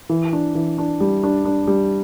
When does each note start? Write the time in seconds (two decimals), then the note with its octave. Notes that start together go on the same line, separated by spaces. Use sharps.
0.10 E3
0.33 D4
0.55 E3
0.78 D4
1.00 G3
1.23 D4
1.45 D4
1.67 G3